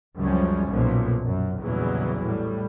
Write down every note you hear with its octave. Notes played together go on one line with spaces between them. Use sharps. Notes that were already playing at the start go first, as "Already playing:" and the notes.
C#2 F#2 C#3 F3 G3 C#4
B1 F#2 A#2 F3
F#2
A#1 E2 C#3 E3 F#3 G3
A2 G3